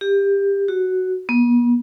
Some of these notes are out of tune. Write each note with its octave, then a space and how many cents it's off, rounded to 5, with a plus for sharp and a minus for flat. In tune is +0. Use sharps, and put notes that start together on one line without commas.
G4 +20
F#4 +5
B3 -45